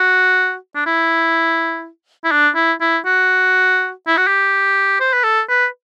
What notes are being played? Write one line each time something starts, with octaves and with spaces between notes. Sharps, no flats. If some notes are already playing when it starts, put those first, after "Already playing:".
Already playing: F#4
D4
E4
E4
D4
E4
E4
F#4
E4
F#4
G4
C5
B4
A4
B4